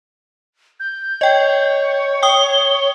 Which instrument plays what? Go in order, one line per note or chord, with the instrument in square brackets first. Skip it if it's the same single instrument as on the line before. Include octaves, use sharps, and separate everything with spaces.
[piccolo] G6
[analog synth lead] C#5 [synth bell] D#5 G5
[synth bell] G5 D#6 [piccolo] G7